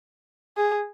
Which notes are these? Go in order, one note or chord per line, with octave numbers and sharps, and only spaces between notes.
G#4